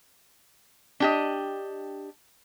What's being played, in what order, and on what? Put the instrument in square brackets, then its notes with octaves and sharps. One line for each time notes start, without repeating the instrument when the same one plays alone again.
[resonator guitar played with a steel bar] D4 G4 D#5